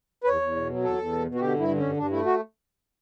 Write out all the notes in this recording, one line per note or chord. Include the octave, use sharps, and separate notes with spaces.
B4
E2 C#5
E2
B2
F#3
E2 A4
E2
B2
B2
F#4
D3 G4
G2 E4
D3
G2 C#4
G2 D4
A3 E4
F#4